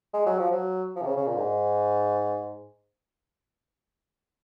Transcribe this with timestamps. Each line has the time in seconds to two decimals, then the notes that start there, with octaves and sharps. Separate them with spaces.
0.14 G#3
0.26 F#3
0.39 F3
0.52 F#3
0.96 F3
1.02 C3
1.07 C#3
1.17 C#3
1.27 A#2
1.38 G#2